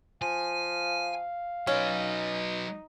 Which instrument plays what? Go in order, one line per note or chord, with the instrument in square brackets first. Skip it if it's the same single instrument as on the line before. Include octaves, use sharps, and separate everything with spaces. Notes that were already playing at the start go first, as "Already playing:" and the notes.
[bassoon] F3 [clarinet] F5 [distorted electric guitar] G#5
[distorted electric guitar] F#3 B4 [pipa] C#4 [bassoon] D#4